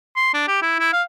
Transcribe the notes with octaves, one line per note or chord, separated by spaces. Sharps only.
C6
D4
G4
E4
E4
F5